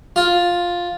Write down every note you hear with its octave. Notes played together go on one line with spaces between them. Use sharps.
F4